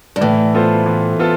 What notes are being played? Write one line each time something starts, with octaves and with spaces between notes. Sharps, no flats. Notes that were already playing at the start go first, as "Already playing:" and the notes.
G2
A2 E3
B3 F4 A4 C5
E3
B3 F4 A4